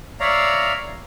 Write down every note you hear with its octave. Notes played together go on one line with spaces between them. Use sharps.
C#5 D5 E5 F5 A#5